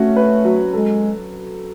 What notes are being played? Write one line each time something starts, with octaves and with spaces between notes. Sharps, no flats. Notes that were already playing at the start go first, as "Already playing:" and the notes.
Already playing: A3 C#4 F#4
B4
F#3
G#3 A4